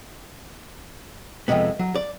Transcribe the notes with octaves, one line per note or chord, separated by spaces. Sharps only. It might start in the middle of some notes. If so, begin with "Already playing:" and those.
F2 G#2 C3 G#3 B3
F#3
D5